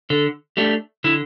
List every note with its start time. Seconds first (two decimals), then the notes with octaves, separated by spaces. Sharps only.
0.10 D3 A4
0.57 A3 D4 G4
1.04 D3 E4